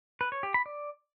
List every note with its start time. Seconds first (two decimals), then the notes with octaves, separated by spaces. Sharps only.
0.21 B4
0.32 C#5
0.43 G4
0.54 B5
0.66 D5